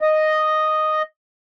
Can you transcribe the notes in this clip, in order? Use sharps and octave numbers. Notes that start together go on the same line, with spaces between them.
D#5